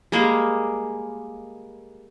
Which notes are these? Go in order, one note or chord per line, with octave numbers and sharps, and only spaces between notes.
G3 G#3 A#3 G#4